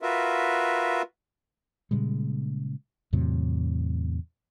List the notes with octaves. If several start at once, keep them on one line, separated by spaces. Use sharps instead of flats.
F4 F#4 A#4 B4 E5
A#2 C#3 G3 G#3
E2 A2 C3 F#3